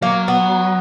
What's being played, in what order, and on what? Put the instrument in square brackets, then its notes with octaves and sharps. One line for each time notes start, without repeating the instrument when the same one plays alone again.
[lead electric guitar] F#3 [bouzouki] A#3
[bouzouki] B3